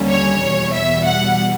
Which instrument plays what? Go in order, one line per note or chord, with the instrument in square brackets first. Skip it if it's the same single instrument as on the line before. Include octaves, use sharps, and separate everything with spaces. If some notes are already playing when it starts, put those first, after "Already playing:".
Already playing: [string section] D#2 D3 G3 A#3 C#4
C#5
E2 B2 G3
E5
F#5